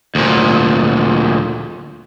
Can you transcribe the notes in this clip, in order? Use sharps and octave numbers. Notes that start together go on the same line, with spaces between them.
D2 A#2